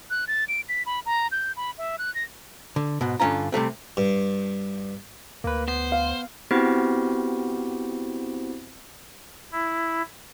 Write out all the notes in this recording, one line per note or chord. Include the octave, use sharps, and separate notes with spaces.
F#6
A6
D7
B6
B5
A#5
G6
B5
E5
F#6
A#6
D3
G#2 B2
G2 D3 C#4 F4 A#5
C3 G3 A3 C4
G2
D2 A#3 B4
B3 C5
F5
B3 C4 E4 F#4 G4 C5
E4